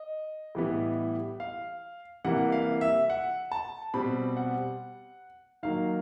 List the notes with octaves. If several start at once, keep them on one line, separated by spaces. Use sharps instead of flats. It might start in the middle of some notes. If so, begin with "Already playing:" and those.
Already playing: D#5
A2 E3 G3 B3
F5
C3 E3 G3 A#3 F#5
F5
E5
F#5
A5
B2 G3 C4 B5
F#5
D#3 F#3 A#3 F5